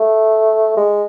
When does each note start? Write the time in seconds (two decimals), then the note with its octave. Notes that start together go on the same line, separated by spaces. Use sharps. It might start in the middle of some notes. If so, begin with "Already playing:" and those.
Already playing: A3
0.77 G#3